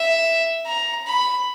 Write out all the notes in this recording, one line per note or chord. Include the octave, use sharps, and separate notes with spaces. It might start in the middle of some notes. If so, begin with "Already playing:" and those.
Already playing: E5
A#5
B5